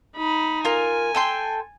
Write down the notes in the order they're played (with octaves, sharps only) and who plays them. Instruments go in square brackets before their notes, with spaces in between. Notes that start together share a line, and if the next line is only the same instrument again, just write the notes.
[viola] D#4 B5
[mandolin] F4 A#4 [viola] G#5
[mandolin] A4 G5 C6